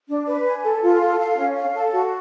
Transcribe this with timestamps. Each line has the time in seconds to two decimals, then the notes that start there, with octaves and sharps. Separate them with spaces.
0.08 D4
0.27 B4
0.45 G#5
0.64 A4
0.82 F4
1.01 A4
1.19 F5
1.37 C#4
1.56 F5
1.74 A4
1.93 F#4